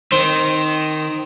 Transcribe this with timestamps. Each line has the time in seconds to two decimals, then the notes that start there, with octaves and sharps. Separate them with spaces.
0.12 D#3 C4